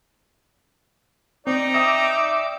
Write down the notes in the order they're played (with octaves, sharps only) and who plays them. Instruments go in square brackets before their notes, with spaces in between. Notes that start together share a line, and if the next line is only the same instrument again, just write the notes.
[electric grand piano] C4 [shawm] D#4 [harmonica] D5
[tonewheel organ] E5 D6 [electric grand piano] G5 D#6 A#6